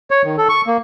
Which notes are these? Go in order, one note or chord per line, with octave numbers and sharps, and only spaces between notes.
C#5
D#3
A4
C#6
A#3